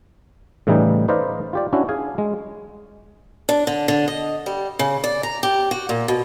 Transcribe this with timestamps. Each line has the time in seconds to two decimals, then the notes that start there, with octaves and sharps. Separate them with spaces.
0.67 A2 C#3 E3 G3 D#4
1.08 D#4 B4 C5 D5 D#5 F5
1.53 F4 G4 D5
1.73 C#4 D4 E4 F#4
1.89 G#4 F5 G#5
2.18 G#3
3.49 D4
3.67 D3
3.88 D3
4.08 D#5
4.46 G3
4.79 C#3
5.04 D5
5.23 A#5
5.43 G4
5.71 F#4
5.89 A#2
6.08 B2